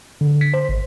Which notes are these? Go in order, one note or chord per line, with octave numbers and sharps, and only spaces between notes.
D3
B6
C5
G#1